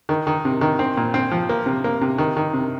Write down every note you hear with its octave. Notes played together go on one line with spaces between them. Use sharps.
D#3
D#3
C3
D#3
C4
A#2
C4
F3
A#3
C3
A#3
C3
D#3
D#3
C3